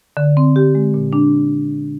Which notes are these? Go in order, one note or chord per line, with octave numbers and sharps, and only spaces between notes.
D3
C4
G4
G#3
A#2
D4